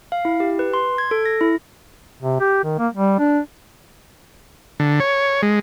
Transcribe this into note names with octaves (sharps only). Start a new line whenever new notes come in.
F5
E4
G4
B4
C6
G#6
A4
A#6
E4
C3
G4
D#3
A#3
G3
D4
D3
C#5
G#3